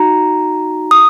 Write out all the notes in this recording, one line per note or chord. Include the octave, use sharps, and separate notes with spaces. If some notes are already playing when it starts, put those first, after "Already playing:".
Already playing: D#4 F#4 A#5
D#6